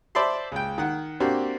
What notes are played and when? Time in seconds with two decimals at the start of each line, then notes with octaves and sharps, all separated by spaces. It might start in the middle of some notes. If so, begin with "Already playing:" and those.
0.15 C5 D5 E5 A5 B5 C6
0.52 C#2 G5
0.78 D#3 F#5
1.20 A#3 C4 D4 F#4 G4